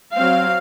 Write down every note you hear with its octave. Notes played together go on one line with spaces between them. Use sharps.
C4 F5
F#3